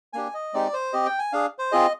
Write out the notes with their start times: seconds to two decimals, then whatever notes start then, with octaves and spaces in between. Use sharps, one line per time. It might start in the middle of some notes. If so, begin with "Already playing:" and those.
0.13 A#3 D4 G4 G#5
0.34 D#5
0.53 G#3 C4 D#4 G4 D5
0.73 C5
0.93 C4 G4 D#5
1.06 G5
1.19 G#5
1.33 D4 G#4 F5
1.59 C5
1.72 C4 F4 G#4 D#5